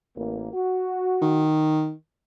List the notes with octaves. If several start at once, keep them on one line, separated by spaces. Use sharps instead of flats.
A1 A#3
F#4
D#3